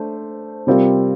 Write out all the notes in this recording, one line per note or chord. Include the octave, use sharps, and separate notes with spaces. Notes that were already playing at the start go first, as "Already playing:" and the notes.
Already playing: A3 D4 C5
C3 G3 C4 F4 A#4